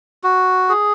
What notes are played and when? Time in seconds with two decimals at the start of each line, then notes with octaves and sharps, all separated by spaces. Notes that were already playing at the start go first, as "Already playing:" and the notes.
0.24 F#4
0.69 G#4